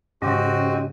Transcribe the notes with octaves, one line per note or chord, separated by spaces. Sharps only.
G#2 C#3 C4 C#4 F#4 G4 D#5